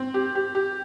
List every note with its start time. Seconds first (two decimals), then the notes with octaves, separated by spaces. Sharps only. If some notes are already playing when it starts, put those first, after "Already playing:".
Already playing: C4
0.14 G4
0.35 G4
0.55 G4